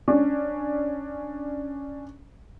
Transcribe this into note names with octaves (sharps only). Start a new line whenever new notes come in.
C#4 D4